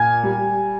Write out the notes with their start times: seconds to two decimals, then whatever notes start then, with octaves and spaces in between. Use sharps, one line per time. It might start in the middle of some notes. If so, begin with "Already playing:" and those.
Already playing: A#2 G#5 G#6
0.23 G3